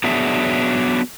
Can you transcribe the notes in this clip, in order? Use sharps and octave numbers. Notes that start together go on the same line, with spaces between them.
F#3 B3 D4 G#4 E5